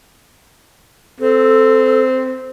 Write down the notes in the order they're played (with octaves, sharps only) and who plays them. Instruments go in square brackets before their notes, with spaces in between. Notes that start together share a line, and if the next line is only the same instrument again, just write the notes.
[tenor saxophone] C4 [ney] A4